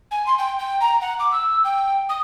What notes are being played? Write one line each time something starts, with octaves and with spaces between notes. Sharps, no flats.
G#5
C6
G5
G5
A#5
F#5
D6
E6
G5
D#6